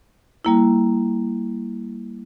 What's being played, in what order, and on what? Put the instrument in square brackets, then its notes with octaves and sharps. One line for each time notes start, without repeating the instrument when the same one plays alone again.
[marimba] G3 A#3 E4